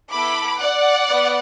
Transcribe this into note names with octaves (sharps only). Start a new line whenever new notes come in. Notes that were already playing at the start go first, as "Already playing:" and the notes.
B3 E4 A4 B5 D6
D5 F#5
B3